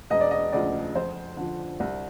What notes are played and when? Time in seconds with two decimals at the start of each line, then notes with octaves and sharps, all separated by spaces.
0.10 E1 D#5
0.21 D5
0.31 D#5
0.52 D2 C#3 F3 D5
0.95 F2 C5
1.37 D3 F3
1.80 C2